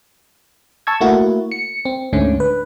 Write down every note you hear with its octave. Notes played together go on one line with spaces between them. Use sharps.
A5 C#6 E6 G#6
A3 A#3 E4 F#4
C#7
C4
D2 G#2 D3 A3 C#4
B4